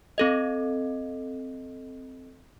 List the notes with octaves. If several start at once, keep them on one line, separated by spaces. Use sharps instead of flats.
C4 A4 D#5